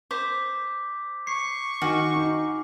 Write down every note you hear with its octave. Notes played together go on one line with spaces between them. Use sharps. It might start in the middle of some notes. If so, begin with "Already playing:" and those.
C5 D6 G6 B6
C#6 C7
D#3 F#4 G#5 D6 F6
D#4